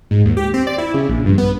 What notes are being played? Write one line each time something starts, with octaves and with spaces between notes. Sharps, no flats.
G#2
D#2
G4
C4
D5
E4
C#3
A#1
G2
B3